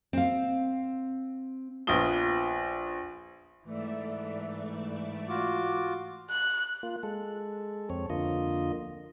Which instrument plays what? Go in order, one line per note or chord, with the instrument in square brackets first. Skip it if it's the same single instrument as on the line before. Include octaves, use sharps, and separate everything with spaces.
[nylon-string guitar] C4 F5
[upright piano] A#1 B3 F4 D#6 G7
[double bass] G#2 E3 [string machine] A3 D5 E5
[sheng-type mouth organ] F4 F#4 D6
[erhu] F#6
[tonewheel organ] A#3 F4
G#3 A4
F2 C4 C#5
F2 D3 A#3 F4 D#5